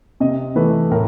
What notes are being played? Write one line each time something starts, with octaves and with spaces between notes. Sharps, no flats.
C3 D#5
E3 A3 B4
A2 A#4